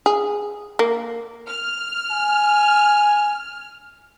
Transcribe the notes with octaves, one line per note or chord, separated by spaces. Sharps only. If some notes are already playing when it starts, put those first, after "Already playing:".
G#4
A#3
F6
G#5